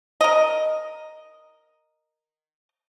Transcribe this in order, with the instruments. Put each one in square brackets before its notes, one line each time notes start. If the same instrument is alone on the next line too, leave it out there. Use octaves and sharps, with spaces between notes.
[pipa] A#4 D#5